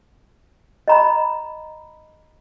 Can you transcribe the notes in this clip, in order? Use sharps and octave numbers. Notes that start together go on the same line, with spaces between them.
D#5 A#5 B5